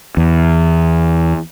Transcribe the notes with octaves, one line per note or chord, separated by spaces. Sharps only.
E2